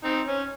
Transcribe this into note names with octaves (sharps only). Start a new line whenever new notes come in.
C4 D#4
C#4